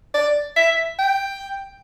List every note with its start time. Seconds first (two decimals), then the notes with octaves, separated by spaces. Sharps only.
0.14 D5
0.57 E5
0.99 G5